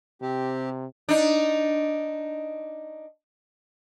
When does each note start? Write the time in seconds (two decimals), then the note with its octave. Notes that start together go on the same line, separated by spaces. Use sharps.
0.22 C3 C4 G4
1.09 D4 D#4